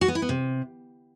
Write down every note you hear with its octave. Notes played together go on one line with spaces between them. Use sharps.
F#4
B3
E4
B3
C3